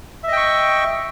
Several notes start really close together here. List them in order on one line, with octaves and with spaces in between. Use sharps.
E5 D#5 G5 C#6